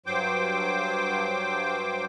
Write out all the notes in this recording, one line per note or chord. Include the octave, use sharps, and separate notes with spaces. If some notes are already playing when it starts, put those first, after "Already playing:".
G2 F#3 C5 G5 D6